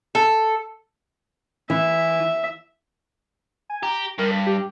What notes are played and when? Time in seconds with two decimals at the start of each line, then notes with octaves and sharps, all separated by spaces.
0.15 A4
1.70 E3 E5
3.70 G#5
3.83 G4 A#5
4.19 G2 A#4
4.31 B6
4.47 G4